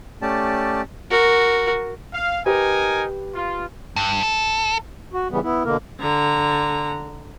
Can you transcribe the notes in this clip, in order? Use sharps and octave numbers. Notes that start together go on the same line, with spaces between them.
A3 C#4 G4 D5 A5
F#4 A#4
F5
D#4 G4 A#4 B4 G#5
F4
G2
A4
F#4
C#3 E3 G3 B3
B3 E4
B2 D3 A#3 A#4
D3 A#5